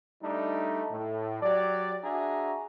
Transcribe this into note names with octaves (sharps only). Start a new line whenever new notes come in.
G3 A3 D4 D#4
A2
F#3 G4 D5
D4 F#4 G#4 E5 A#5